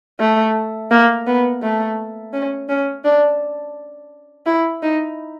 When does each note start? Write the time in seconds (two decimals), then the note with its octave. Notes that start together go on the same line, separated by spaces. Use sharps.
0.20 A3
0.91 A#3
1.27 B3
1.62 A3
2.33 C#4
2.69 C#4
3.04 D4
4.46 E4
4.82 D#4